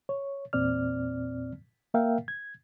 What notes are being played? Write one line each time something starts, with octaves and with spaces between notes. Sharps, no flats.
C#5
E2 A#2 C4 D5 F6
A#3 A#4 E5 F5 G5
G#6